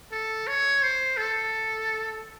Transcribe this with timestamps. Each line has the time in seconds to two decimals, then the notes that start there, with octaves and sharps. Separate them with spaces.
0.12 A4
0.47 C#5
0.82 C5
1.17 A4